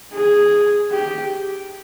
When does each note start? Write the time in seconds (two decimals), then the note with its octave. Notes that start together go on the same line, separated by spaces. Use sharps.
0.13 G#4
0.92 G4